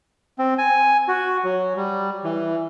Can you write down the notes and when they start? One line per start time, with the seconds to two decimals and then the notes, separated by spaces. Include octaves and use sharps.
0.38 C4
0.58 G#5
1.08 F#4
1.44 F#3
1.77 G3
2.24 E3